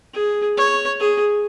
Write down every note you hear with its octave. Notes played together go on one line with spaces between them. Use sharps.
G#4
C#5
G#4